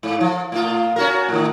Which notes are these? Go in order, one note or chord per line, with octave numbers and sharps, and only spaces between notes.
G#2
F3
A2 F4
C#4 F#4 A#4
A2 D#3